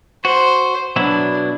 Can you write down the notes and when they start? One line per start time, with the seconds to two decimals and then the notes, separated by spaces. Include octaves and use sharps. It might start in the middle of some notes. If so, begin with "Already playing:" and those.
0.25 F#4 C5
0.96 B2 F#3 D4 E4